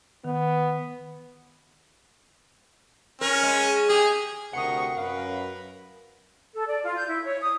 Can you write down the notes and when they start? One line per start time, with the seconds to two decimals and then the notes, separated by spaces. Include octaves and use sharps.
0.24 D#3 B3
3.21 C#4 A#4
3.43 G#3
3.90 G4 G#4
4.53 D2 C3 A#4 F#5 C#6 D#6 C#7
4.97 F#2 A#4 B4 F5
6.53 A4
6.67 D5
6.83 F4
6.96 G6
7.08 E4
7.25 C#5
7.41 D#6